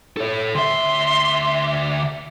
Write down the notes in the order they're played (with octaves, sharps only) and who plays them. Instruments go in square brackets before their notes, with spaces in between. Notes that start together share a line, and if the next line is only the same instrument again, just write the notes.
[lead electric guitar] A4 C#5
[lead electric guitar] D2 E5 [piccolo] C6